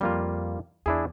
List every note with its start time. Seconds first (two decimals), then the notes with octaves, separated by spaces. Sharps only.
0.01 F2 G3 A#3 F4
0.86 E2 D4 E4 G#4